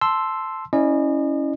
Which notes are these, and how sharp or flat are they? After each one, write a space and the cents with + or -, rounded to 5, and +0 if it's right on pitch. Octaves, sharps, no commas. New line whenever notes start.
A5 +0 C6 +0 E6 +0
C#4 +0 E4 -25 D#5 -40